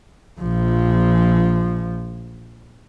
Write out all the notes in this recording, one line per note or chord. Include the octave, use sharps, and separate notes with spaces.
A#1 F3